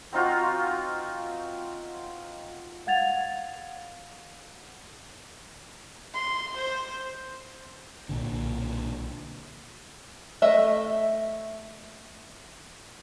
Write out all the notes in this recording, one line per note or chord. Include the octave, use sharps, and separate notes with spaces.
C4 D#4 F4 F#4
F5 F#5 G#6 A6 F7
C6
C5
B1 A#2 D3
A3 D#5 E5